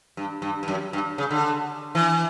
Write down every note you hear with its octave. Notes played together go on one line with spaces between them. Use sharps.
G2
G2
G2
F#2
G2
C#3
D3
E3